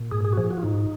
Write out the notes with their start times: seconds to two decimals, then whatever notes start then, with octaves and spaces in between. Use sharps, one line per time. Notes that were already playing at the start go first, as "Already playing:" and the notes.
Already playing: A#2
0.11 G#2 G#4
0.24 G#4
0.33 F#4
0.37 F3 G#4
0.51 F#4
0.57 F4
0.63 G#2 D#4